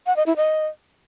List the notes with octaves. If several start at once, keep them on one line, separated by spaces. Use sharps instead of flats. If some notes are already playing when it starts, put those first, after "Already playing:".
F#5
D#5
E4
D#5